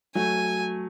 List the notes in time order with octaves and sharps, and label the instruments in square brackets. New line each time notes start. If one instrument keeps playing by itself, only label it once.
[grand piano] F#3 A3 [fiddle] G#5